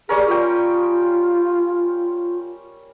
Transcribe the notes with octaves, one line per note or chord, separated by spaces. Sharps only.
G3 C#4 G#4 A#4
F4 G5 D#6